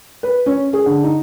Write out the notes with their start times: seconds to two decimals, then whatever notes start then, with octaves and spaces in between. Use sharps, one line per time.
0.23 B4
0.46 C#4
0.73 G#4
0.86 D3
1.04 D#4